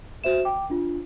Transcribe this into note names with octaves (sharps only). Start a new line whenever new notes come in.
F#4 C5 E5 E7
G5 D6
D4 F4